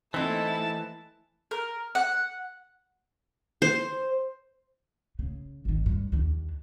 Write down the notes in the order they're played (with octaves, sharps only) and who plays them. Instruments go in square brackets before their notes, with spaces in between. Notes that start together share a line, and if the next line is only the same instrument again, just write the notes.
[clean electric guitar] E3 [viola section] A3 A#3 E4 [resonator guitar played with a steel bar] C4 D#4 [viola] A5
[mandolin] A#4
F#5
[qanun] C5
[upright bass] C#3
G#1 D#3
G2
D#2 D4